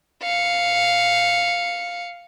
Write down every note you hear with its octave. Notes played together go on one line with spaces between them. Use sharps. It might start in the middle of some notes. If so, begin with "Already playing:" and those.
F5 C#7